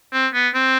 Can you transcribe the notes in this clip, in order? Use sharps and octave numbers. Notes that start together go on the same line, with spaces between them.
C4
B3
C4